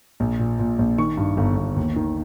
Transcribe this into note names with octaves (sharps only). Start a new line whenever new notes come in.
A#1
A#2
A#2
A#1
D#3 C#6
G2
G1
G1
D#2
D#3